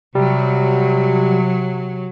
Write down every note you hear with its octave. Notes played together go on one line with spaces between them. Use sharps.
C3 F#3 G3